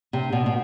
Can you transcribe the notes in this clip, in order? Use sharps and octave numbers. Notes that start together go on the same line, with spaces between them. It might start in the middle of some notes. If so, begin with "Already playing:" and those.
C3
B2
B2